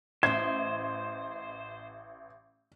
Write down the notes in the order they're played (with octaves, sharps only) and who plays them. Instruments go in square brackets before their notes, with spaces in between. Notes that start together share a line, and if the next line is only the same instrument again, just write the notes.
[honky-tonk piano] A1 [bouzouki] E4 D#5 [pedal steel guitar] C5 [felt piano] G#6